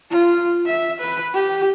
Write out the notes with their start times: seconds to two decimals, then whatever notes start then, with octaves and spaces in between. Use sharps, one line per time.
0.10 F4
0.66 E5
1.00 B4
1.34 G4